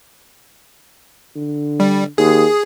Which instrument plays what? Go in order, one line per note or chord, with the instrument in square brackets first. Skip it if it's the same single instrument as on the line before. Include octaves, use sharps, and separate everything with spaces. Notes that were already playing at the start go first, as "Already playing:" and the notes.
[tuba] D3
[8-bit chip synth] G3
[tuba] D#2 [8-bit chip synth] G#4